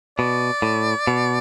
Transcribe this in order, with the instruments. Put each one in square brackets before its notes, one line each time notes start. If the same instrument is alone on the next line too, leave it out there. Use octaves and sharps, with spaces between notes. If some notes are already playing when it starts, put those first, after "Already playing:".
[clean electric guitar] B2 [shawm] D5
[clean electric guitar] A2
B2